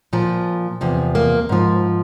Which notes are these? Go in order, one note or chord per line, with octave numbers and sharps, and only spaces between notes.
A#2 F3
E2 C3 F3
A#3
G#2 F3